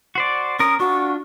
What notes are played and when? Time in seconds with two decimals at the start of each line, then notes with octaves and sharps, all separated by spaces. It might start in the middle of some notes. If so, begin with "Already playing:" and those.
0.15 F#4 C5 D5
0.59 C#4 A#4 D#6
0.80 D4 F4 F#4 C#6